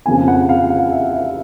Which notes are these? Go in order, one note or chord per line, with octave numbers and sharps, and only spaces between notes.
F2 C#3 F3 A#3 G#5
F#5
F5
F5
E5
E5